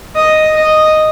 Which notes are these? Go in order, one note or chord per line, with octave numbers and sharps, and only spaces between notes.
D#5
D#5